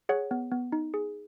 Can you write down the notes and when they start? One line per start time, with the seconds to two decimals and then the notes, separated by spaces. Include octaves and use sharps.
0.09 G#4 C#5 F#5
0.31 B3
0.52 B3
0.72 D#4
0.94 G#4